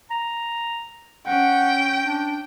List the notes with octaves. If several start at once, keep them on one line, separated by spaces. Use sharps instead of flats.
A#5
C#4 F#5 G5
D4